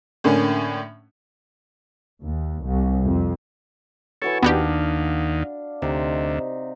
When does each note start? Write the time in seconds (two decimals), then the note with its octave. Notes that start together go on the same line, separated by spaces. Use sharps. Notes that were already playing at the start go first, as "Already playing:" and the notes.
0.24 A2 D3 A#3 C#4
2.21 D#2
2.63 C2
3.04 F2
4.22 E3 F#4 A4 C#5 C#6
4.43 D#2 B3 D4 F#4 G4 F5
5.82 D2 C3 D#4